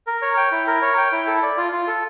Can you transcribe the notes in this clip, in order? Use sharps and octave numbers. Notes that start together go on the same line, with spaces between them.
A#4
C#5
G5
E4
A#4
C#5
G5
E4
A4
D5
F4
F4
A4